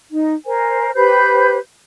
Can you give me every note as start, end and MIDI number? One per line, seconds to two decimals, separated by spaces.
0.11 0.34 63
0.46 0.90 70
0.46 0.90 72
0.46 0.90 80
0.94 1.58 67
0.94 1.58 71
0.94 1.58 72
0.94 1.58 91